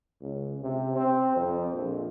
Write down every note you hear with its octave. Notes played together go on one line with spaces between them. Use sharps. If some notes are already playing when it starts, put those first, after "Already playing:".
C#2
C3
C4
F2
A#1